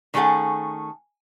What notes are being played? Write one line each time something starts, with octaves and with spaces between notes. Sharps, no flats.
D#3 A3 C#4 G#4 A4 F#5